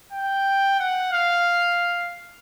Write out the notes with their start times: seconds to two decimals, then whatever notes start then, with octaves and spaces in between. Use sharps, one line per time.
0.12 G5
0.80 F#5
1.12 F5